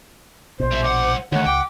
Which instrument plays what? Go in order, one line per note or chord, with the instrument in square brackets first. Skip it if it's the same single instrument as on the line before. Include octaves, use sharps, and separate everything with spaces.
[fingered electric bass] A#1 B2 [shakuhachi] C5
[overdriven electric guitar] G3 E5
[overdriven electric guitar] C2 F#5 [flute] D6
[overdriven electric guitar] D#2 [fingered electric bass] D3 A3 [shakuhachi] C#5 [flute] F#5
[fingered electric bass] C#2 [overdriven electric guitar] G5 [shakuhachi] D6